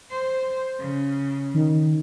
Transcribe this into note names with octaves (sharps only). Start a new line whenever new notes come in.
C5
C#3
D#3